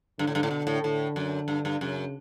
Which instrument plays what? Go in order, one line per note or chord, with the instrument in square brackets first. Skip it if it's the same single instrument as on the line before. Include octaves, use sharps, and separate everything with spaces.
[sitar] G2 [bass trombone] D3
[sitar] A2
G2
A2
B2
A2
[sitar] A2 [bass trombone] D3
[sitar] F#2
G2
G2
[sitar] F#2 [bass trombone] C#3